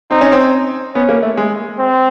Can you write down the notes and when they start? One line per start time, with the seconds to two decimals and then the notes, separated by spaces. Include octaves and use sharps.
0.11 C4 D#4
0.21 C#4
0.32 C4
0.94 B3 C#4
1.09 A#3
1.23 A3
1.37 G#3
1.79 C4